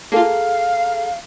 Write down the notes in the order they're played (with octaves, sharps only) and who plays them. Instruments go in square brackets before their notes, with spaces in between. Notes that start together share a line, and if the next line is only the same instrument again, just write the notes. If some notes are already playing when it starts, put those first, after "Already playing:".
[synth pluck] A#3 F4 [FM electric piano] G#4 A4 A#5 [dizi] F5